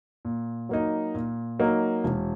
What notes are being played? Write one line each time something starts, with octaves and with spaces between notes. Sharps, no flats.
A#2
F#3 A#3 D#4
A#2
F#3 A#3 D#4
E1